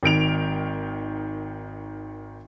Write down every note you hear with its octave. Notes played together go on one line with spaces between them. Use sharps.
G#1 D#3 D7 F7